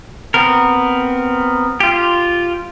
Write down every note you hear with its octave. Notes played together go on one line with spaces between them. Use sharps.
B3 C4 A#4
F4 G4